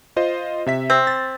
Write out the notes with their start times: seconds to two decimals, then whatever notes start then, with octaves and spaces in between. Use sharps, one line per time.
0.16 F4 C5 D#5
0.66 C3 E5 B6
0.90 C4
1.07 A6